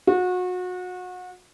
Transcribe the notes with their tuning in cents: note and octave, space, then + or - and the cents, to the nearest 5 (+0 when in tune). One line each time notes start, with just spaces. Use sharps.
F#4 -30